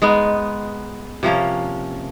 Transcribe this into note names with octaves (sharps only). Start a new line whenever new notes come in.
G#3 B3 D#4
C3 F3 A#3 C#4